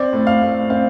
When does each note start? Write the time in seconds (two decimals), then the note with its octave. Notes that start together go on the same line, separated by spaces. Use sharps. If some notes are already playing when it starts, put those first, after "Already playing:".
Already playing: C4 D5
0.13 A2
0.27 F5
0.42 A2
0.70 C4 F5